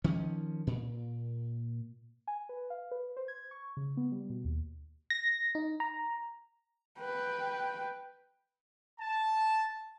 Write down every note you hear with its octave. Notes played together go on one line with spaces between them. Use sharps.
D#3 F3 C#4
A#2
G#5
B4
F5
B4
C5
G#6
C#6
C#3
B3
G3
B2
D#2
A#6
D#4
A#5
B4 G5
A5